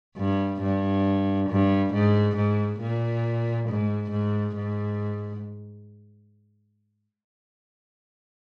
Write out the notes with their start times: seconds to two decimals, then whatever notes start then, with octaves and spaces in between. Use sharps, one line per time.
0.17 G2
0.61 G2
1.49 G2
1.94 G#2
2.36 G#2
2.80 A#2
3.69 G#2
4.11 G#2
4.56 G#2